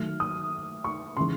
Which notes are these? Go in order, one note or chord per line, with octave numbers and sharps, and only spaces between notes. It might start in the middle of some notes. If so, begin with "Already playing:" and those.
Already playing: D#3 F#3 A3 F6
D#6
C#6
C#3 E3 G#3 C6